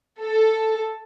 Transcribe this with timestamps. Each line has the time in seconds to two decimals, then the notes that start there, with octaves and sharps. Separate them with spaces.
0.19 A4